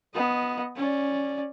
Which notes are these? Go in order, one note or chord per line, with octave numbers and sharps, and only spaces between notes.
B3 D#5
C#4 D5